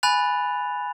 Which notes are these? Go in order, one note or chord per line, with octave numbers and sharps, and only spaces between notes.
G#5 B5 F#6 A6 F7